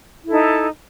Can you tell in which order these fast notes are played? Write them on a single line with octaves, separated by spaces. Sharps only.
E4 A4 D#4